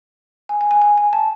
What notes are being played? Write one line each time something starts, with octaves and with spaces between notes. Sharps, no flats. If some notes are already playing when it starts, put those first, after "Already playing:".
G#5
G#5
G#5
G#5
G#5
A5